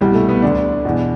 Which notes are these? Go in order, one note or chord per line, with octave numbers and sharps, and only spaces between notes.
C2 B2 G3
A3
B3
D2 D3 D4
E2 B2